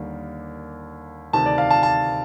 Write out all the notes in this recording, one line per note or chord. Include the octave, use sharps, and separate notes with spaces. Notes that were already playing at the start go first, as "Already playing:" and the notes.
Already playing: D#2 D3 G3 A#3
D2 C3 D#3 A5
D5
F5
A5
A5